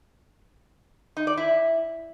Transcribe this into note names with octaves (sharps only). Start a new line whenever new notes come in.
D#4
D5
E4